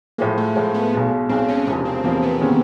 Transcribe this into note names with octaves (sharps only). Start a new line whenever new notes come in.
A2 F3 G#3 A#3
A3
A2 F3 G#3 A3
B3
B1 B2 G#3
B1 B2 G#3 C4
C#4
E1 E2 C3 F3 C#4
C4
E1 E2 C3 F3 A#3
B3
C3 D#3 G#3 C#4